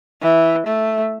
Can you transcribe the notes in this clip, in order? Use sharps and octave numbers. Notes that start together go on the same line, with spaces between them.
E3
A3